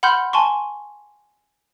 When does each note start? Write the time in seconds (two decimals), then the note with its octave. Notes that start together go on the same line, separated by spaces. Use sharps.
0.03 F#5 B5 C6 F6 G6
0.33 G#5 A5 C6 C#6